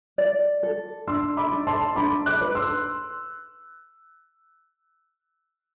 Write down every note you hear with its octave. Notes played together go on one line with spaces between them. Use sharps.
D5
A4
D4 C6 E6
B5 D6
D4
A5 C6
D4 B5 D6
D6 F#6
B4
C6 E6